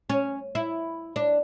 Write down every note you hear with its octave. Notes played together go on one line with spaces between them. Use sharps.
C#4
E4
D4